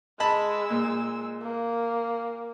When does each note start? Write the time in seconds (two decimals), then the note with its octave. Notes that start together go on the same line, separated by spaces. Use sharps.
0.20 G#3 D#5 A5 B5 E6
0.70 A#2
1.42 A#3